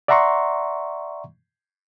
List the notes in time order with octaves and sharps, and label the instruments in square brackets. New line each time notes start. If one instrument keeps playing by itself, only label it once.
[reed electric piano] D5 E5 F#5 A#5 C6 C#6